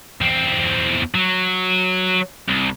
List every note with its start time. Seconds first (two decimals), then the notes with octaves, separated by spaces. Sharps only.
0.21 E2 C4
1.15 F#3
2.48 C2